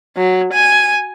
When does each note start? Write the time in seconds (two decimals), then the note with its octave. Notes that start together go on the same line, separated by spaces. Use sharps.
0.17 F#3
0.53 G#5